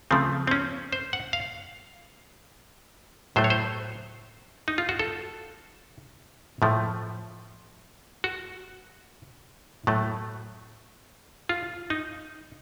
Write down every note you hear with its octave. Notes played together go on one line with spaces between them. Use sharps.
C#3 F3 A3 C4
C4
C#4
C5
F#5
F5
A2 F#3 A3 C5
C#5
C5
D#4
F4
F#4
A4
A2 F3 A3
F#4
A2 F#3 A3
F4
D#4